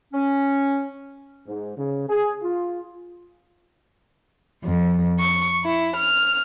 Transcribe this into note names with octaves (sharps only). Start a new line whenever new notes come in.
C#4
G#2
C#3
G#4
F4
F2
C#6
E4
F6